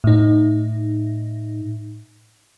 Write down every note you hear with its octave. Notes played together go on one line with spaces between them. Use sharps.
A2 D#4